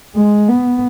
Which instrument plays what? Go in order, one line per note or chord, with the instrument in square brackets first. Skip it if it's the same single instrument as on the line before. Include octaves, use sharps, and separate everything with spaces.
[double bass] G#3
B3